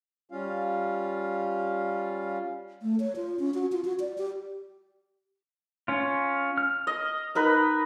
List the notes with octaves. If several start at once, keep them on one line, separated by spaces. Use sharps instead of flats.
G3 C#4 F4 F5
A3
C#5
F4
C#4
F#4
F4
F#4
D5
G4
C#4 F4
F6
D#5
D#4 A#4 B4